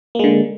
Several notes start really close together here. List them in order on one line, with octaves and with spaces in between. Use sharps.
A#3 G#3 D3